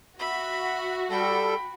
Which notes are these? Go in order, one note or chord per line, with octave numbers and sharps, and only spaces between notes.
F#4 E5 B5
G3 A4 G5 B5